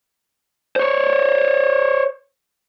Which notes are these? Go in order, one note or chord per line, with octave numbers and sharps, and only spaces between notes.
C5 C#5